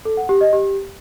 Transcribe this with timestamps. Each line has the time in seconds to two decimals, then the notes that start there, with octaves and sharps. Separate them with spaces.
0.05 A4
0.17 F#5
0.29 G4
0.41 D#5
0.53 G4